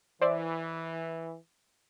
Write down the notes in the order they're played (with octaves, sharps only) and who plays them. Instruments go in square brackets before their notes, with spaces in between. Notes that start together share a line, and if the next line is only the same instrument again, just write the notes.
[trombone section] E3 [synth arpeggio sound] C5 D5 E5